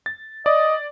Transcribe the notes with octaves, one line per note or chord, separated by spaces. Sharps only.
A6
D5 D#5